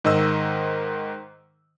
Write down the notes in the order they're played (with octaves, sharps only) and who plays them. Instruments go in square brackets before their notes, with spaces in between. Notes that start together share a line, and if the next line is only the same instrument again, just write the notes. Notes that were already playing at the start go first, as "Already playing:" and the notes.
[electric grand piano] G#2 D#3 D#5 E6